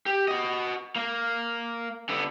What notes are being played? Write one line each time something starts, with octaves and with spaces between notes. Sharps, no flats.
G4
F#4 D#5
A#3
D3 B3